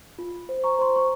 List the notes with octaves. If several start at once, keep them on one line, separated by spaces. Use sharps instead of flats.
F4
C5
A#5 C#6
C5 C6
C#6